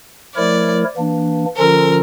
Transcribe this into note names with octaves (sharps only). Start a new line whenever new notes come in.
F3 A3 E4 A#4 C#5 D5
E3 A#3 D4
D3 F3 C#4 F4 A4 A#4